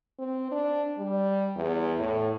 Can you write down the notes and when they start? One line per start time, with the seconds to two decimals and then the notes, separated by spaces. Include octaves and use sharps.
0.19 C4
0.51 D4
0.98 G3
1.56 E2
1.99 A2